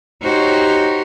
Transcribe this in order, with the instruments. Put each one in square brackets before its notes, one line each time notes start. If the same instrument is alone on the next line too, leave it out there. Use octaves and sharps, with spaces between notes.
[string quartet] D#4 F#4 G4 C5 C#5